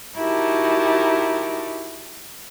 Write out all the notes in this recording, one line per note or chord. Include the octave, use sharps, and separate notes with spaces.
D#4 E4 F#4 G4 A#4 A5